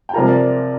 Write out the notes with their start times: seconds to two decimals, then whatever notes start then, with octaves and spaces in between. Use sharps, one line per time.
0.09 G5
0.13 C3 F3 A#3 F4 A#5
0.28 D5